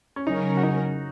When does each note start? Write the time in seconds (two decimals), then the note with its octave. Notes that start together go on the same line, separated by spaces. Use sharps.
0.16 C#4
0.27 C#3 F#3 C#4 D#4 A#4
0.57 F#4
0.63 D#4